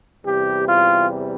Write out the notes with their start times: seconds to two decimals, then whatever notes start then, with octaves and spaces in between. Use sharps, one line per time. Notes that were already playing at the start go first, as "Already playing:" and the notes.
0.24 E2 C3 G3 G4
0.67 F4